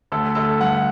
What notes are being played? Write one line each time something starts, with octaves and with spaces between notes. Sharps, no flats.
D2 A4
D2 A4
G2 F#5